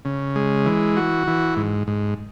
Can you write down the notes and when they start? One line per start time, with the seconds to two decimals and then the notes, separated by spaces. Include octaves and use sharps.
0.05 C#3
0.36 G#3
0.66 E3
0.97 F#4
1.27 E3
1.57 G#2
1.87 G#2